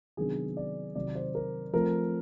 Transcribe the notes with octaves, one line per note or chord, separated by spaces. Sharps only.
C3 D#3 F#3 B3 D4 G#4
D5
C3 D#3 F#3 D5
C5
A#4
F3 A3 C4 A#4